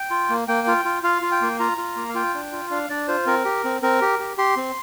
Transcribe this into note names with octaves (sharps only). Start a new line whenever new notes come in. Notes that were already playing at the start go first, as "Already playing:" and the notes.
Already playing: G5
F4
A#3
A#3 G5
F4
F4
F4 F5
F4
G5
A#3
F4 A#5
F4
A#3
F5
F4 G5
D4
F4
D4 F5
D4 D5
F4 C5
C4 A#4
G4
C4
C4 A#4
G4
G4
G4 C6
C4